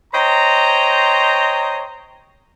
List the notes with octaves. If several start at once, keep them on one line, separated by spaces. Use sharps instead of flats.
C5 C#5 D#5 G5 A#5